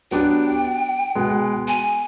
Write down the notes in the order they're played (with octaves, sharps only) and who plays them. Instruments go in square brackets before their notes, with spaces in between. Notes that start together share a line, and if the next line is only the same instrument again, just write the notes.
[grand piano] F#3 B3 D4 G4 [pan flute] G5
[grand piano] B2 G#3 B3
[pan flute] G#5